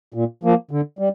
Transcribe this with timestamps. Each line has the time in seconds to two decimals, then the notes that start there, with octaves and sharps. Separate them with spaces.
0.14 A#2
0.43 F3 A#3
0.71 D3
0.99 G3